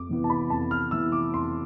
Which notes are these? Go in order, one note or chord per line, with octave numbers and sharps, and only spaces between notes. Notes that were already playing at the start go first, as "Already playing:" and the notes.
Already playing: F2 D6
C3 E3 B3
A5
B5
F2 A5
F6
C3 E3 B3 E6
D6
F2 C6